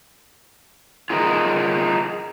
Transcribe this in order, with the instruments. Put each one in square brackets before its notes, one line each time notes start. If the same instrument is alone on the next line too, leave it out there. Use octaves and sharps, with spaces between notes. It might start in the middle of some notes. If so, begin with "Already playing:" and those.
[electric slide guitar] F4 G#4 A#4 D#5